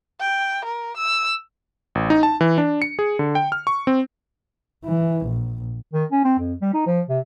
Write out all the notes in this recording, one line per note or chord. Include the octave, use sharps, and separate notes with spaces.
G5
A#4
E6
A1
D#4
A5
E3
D4
C#7
G#4
D3
G5
F6
C#6
C4
E3
A#1
D#3
C#4
C4
F2
G3
D#4
F3
C3